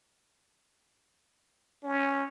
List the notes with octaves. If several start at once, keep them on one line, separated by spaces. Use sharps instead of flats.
C#4